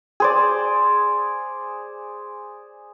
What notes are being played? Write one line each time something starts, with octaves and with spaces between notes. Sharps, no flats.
G#4 C5 D5